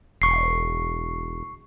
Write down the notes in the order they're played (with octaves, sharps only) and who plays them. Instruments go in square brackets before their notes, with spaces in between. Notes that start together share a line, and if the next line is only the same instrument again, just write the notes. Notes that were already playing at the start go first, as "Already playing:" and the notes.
[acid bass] E1 [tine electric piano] C#6 C7